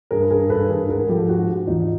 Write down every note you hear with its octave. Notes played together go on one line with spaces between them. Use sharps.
G2 G#4 A#4
B4
G2 G#4 A#4
G2 A4 B4
D#3 G#4 A#4
G#2 G#4 A#4
F3 G4 A4
G#2 F#4 G#4
G#2
E2 D#4 F4